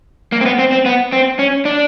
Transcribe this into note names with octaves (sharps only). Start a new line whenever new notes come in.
A#3
C4
B3
C4
C4
B3
C4
C#4
D4